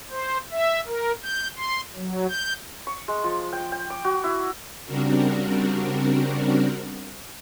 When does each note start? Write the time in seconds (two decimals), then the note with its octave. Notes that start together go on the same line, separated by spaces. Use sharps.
0.10 C5
0.52 E5
0.87 A#4
1.23 G6
1.56 C6
1.95 F#3
2.29 G6
2.87 C#6
3.08 G#3
3.24 F3
3.53 G5
3.72 G5
3.90 D6
4.05 F#4
4.24 E4
4.86 C#3 G3 C4 D4 F#4 A#4